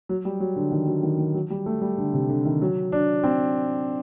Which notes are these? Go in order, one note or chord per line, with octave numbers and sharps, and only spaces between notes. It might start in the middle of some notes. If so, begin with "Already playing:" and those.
F#3
G3
F#3
D3
D#3
F#3
D#3
D#3
F#3
G3
A3
G3
D3
C3
D3
D#3
F#3
D4
C4